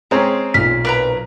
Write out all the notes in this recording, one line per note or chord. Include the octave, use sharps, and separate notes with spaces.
G#3 C4 C#4 A#5
B1 A#2 F6 B6
A#4 B4 A#5